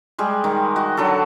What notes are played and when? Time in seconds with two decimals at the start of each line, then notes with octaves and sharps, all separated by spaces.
0.18 G3 G#3 G#4
0.44 D#3
0.76 F#4 D#5
0.97 D3 F#3 F#4 A4